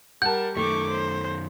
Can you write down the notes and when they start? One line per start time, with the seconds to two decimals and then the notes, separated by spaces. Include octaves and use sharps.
0.22 G3 A#4 F#5 A5 G6
0.57 F#2 D#3 A3 C#6 D6
0.91 C5